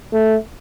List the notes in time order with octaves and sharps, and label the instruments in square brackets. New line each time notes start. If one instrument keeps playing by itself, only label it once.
[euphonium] A3